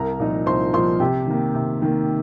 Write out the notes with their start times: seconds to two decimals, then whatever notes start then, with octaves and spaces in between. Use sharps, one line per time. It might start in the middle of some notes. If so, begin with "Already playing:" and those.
Already playing: C2 A#4 A#5
0.20 A#2 F3 D#4
0.46 C2 C5 C6
0.73 A#2 F3 D#4 C5 C6
1.00 C3 G4 G5
1.27 D#3 A#3
1.55 C3
1.82 D#3 A#3